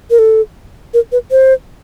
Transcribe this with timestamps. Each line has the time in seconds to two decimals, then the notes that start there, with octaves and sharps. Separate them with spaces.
0.11 A#4
0.19 A4
0.94 A#4
1.12 B4
1.31 C5